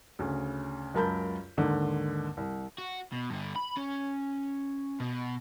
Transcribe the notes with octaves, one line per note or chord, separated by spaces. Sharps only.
D2 C#3
C#2 F#2 A#4 A5 B5 G6
D#2 G#2 D3 D#3
C2
F#4
B2
G2 D3
B5
C#4
B2